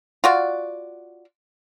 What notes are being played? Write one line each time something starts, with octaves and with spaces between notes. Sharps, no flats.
F4 F#4 D5